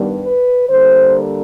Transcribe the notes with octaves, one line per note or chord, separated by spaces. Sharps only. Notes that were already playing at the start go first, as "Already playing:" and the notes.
Already playing: G2 D#3 G3 B3
B4
D3 G3 A#3 C5